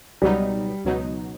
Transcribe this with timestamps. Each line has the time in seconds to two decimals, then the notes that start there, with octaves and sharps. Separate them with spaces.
0.22 C#2 B2 F#3 G3 B3 D#4
0.85 C#2 B2 F#3 B3 D#4